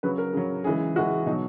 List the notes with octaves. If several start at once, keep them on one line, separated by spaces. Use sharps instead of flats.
C#3 F#3 B4
A#4
C#3 F#3
C#3 E3 G#3 G#4
C#3 E3 G#3 F#4
B2 F#3 D#4